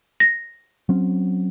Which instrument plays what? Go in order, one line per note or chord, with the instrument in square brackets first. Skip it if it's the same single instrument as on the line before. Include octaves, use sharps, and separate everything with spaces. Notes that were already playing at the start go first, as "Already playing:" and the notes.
[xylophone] A#6
[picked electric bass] F#3 C4 C#4